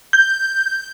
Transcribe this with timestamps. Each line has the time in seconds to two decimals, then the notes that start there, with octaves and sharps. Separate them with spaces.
0.13 G6